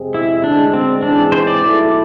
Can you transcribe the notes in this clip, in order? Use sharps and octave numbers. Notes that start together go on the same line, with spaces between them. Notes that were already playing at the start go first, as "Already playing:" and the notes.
Already playing: F2 C3 G#3 C4 G#4
E4
D2 D3 G#3 D4
C4
G#2 E3 G#3 C4 D4 G#4
C5
D5
B1 B2 A3 E4 A4